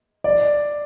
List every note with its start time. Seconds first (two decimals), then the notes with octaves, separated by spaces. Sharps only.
0.24 D5